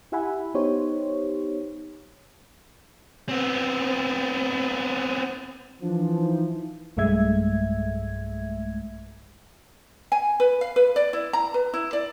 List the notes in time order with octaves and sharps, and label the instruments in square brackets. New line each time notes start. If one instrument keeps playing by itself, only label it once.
[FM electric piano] E4 G4 E5 F#5 G#5 B5
B3 D#4 G4 C5 C#5
[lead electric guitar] B3 C4
[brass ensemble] E3 F3 [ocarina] D4
[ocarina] D#4
[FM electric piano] B1 G2 G#3 A3 E5 G#6
[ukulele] G#5
B4
F5
B4
D5
E4
A#5
B4
E4
D5